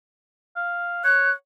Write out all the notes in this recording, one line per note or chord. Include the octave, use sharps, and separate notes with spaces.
F5
C#5 F#6